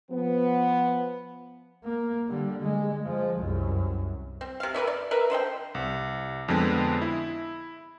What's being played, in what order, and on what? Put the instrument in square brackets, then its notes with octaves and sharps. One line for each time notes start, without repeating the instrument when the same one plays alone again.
[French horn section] F3 B3
[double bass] A#3
D3 G3
G#3
F3 G#3
C2 F#2
[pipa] C4
C3 F5
A#4 B4 D5 E5
D5
A#4 B4 E5
D3 C5 D#5 G5
[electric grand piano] C2
F2 D3 G#3 B3
E4